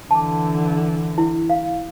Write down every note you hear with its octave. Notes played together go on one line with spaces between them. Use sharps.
D3 E3 A5 D6
E4
F5